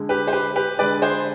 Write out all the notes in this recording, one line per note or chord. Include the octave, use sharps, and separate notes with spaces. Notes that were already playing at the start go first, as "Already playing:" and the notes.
Already playing: D3 G#3
G4 B4
C5
G4 B4
G4 B4
D3 G#3 B4 D5
G#4 C5